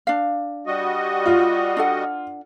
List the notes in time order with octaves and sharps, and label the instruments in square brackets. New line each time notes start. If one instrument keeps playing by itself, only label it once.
[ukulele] D4 F5
[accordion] G3 F#4 D#5
[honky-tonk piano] F4
[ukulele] D4 A4 F#5